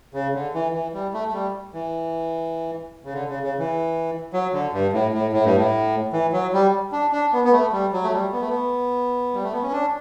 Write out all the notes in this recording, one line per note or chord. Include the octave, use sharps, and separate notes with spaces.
C#3
D3
E3
E3
G3
A3
A3
G3
E3
C#3
D3
C#3
C#3
E3
F#3
D3
G2
A2
A2
A2
G2
A2
E3
F#3
G3
D4
D4
B3
B3
A3
G3
F#3
A3
G3
B3
A3
B3
G3
A3
B3
C#4
D4